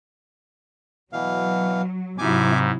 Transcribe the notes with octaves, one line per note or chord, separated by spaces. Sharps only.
B2 E3 F#3 F5
G#2 C3 F#3 E4 G#5 D6